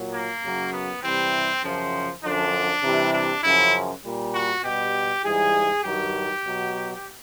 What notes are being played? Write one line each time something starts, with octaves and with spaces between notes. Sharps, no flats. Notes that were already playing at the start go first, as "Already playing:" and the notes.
Already playing: A#2 F#3
A#3
F#2 C#3 F#3
B3
C3 E3 G3 C4
F#2 C#3 F3
F#2 D3 F3 D4
C3 E3 G3
D4
F#2 C#3 F3 E4
A#2 G3
F#4
B2 G3 G4
G#2 E3 G3 G#4
G2 D#3 F#3 G4
B2 F#3